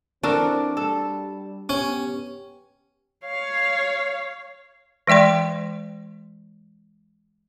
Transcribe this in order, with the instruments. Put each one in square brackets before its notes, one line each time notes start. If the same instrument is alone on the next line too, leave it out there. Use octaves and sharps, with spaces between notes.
[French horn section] E3 C4 [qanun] D4 [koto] F#4 A4 A#4
[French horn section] G3 [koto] A4
[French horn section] B3 G4 [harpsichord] C#4
[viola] C#5 F5
[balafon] E3 G#3 D5 G5 C6